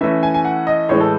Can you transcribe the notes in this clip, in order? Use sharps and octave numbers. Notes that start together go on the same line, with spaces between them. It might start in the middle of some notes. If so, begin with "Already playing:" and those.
E3 A3 C#4 E5
G#5
G#5
F#5
D#5
A2 E3 G#3 C#5
A4